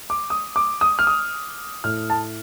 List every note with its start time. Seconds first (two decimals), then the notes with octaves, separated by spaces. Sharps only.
0.10 D6
0.30 D#6
0.56 D6
0.81 D#6
0.99 F6
1.07 D#6
1.84 A2 A3 F6
2.10 A5